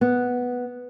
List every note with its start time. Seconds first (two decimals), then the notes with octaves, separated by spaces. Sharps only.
0.01 B3